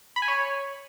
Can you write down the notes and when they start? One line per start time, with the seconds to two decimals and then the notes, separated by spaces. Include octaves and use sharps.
0.16 B5
0.22 G#5
0.28 C#5